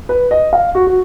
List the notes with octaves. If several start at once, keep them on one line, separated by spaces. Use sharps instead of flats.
B4
D#5
F5
F#4
F#4